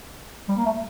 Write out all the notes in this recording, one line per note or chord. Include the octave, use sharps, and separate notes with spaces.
G3
A#3
A3